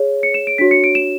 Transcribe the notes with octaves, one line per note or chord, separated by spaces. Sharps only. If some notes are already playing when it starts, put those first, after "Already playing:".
Already playing: G#4 C#5
C#7
E7
D7
D4 F#4 C#5 B6
C#7
D7
E7